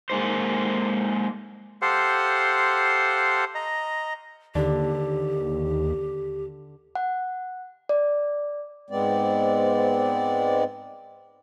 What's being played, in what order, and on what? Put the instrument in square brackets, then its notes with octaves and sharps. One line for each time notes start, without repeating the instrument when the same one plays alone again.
[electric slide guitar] G#3 A#3 D#4 C5
[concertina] G4 A4 C5 F5 F#5 C6
D#5 A#5
[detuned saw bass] D#2 [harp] D3 [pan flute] G4
[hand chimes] F#5
D5
[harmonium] G#2 G#3 B3 C4 D5